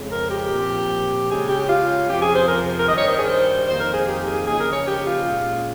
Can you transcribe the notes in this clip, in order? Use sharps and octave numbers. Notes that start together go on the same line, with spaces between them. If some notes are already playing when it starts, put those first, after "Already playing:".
Already playing: F2 C#3 G#3 C4
A#4
G4
A#2 F3 C4
C#3 G#3 C#4 G#4
G4
G4
F4
F2 C3 F3 C4 G4
G#4
C5
A#4
C5
A#4
G2 D#3 G3 D#5
C#5
C5
G#4
C5
F2 D#3 A#3 D#4 C5
A#4
G#4
G4
G#4
C#3 F3 A#3 D#4 G#4
A#4
C#5
G4
F4
A#2 G#3 C#4